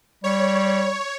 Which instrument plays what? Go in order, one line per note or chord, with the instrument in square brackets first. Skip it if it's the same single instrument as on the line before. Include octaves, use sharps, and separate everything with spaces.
[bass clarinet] G3 [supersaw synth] C#5